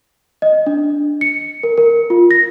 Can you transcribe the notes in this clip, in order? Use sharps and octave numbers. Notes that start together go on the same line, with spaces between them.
D#5
D4
C#7
A#4
A#4
F4
A#6